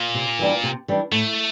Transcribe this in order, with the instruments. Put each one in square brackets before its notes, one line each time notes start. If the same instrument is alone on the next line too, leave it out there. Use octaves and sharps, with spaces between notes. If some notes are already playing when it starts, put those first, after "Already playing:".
Already playing: [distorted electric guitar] A#2
[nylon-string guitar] C3
E3 G3 D4
C3
E3 G3 D4
[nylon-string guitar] A2 [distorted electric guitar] A3